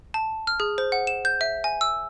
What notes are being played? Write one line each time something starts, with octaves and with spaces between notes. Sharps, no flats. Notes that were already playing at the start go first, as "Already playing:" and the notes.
A5
F6
G#4
C5
F#5
E7
G6
E5
G#5
E6